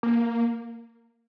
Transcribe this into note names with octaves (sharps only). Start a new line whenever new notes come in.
A#3